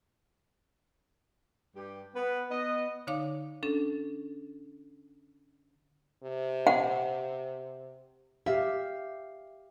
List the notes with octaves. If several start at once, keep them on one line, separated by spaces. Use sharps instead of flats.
G2 G4
B3 B4
B3 D#5
D3 D#4 C#5 F5 D6
C#4 D4 A4
C3
F#5
G4 E5 F5